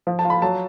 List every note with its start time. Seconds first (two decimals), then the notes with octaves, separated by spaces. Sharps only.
0.07 F3
0.19 A5
0.25 F4
0.30 B5
0.42 F#3 A5